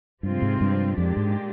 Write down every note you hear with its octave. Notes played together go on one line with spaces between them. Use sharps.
G2 C3 F3 G#3 C4 F4
G#2
G2
F2 A#2 G#3 D4 G4
G#2